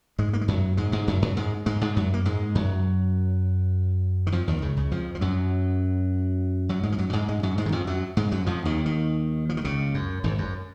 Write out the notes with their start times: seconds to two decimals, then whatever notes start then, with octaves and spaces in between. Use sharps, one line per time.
0.19 G#2 G#3
0.33 A#3
0.41 G#3
0.48 F#2 F#3
0.77 G#2 G#3
0.92 G#2 G#3
1.08 F#2 F#3
1.22 F#2 F#3
1.37 G#2 G#3
1.66 G#2 G#3
1.81 G#2 G#3
1.96 F#2 F#3
2.14 A#3
2.25 G#2 G#3
2.55 F#2 F#3
4.27 D#3
4.32 F2 F3
4.47 D#2 D#3
4.62 C#2 C#3
4.77 C#2 C#3
4.91 F2 F3
5.15 F3
5.21 F#2 F#3
6.69 F#2 F#3
6.83 G#2 G#3
6.92 F3
6.98 F#2 F#3
7.10 F#3
7.13 G#2 G#3
7.28 G#2 G#3
7.43 F#2 F#3
7.58 G#2 G#3
7.66 D#3
7.72 F2 F3
7.87 F#2 F#3
8.17 G#2 G#3
8.31 F#2 F#3
8.46 F2 F3
8.65 D#2 D#3
8.86 D#2 D#3
9.49 F3
9.57 D#3
9.64 C#2 C#3
9.94 F#2
10.24 G#1 G#2
10.38 F#2